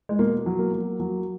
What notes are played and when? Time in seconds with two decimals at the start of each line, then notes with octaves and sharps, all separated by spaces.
0.09 G#3
0.19 B2 A#3
0.46 F#3
0.59 A#3
0.73 F#3
1.00 F#3